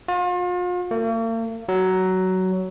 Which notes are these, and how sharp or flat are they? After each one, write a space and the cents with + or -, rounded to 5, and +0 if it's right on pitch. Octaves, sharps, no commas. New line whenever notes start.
F4 +40
A#3 -45
F#3 +15